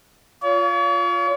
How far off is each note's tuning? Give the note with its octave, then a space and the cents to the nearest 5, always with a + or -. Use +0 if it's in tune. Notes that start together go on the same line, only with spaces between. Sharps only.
F4 +0 C#5 +40